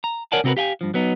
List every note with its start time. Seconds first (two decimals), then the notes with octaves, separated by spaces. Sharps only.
0.04 A#5
0.32 A#4 C#5 D5 F#5 G#5 A5
0.44 C3 C4 F#4 A#4 B4
0.57 G4 F5 G5 G#5
0.81 G2 F3
0.94 F#3 B3 D#4